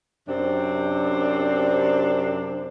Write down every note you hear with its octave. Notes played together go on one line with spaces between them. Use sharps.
F#2 C3 C4 D4